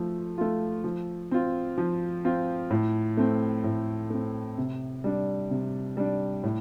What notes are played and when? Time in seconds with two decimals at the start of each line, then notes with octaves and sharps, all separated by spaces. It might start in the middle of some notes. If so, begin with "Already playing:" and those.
Already playing: F3 A3
0.38 A3 F4
0.84 F3
1.31 C4 F4
1.78 F3
2.25 C4 F4
2.71 A2
3.17 A3 C4
3.64 A2
4.10 A3 C4
4.58 C3
5.04 G3 D4
5.50 C3
5.97 G3 D4
6.43 A2